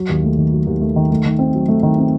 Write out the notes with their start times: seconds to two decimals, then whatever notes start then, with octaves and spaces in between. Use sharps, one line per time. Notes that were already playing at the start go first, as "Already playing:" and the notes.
Already playing: F#3
0.09 D#2
0.24 A3
0.38 D#3
0.52 F#3
0.67 D#2
0.81 A3
0.96 D#3
1.11 A3
1.25 D#3
1.39 C4
1.54 F#3
1.68 A3
1.83 D#3
1.98 C4